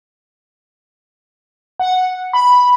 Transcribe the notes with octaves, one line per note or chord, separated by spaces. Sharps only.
F#5
B5